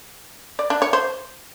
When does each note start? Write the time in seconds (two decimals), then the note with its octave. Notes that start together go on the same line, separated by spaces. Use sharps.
0.59 D5
0.70 D4
0.82 C#5
0.93 C5